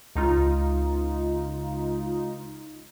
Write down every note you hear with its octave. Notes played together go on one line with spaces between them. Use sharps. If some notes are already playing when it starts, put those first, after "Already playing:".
C#2 D#4 F4